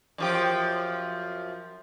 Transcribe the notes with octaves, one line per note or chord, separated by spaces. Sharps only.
F#2 F3 G4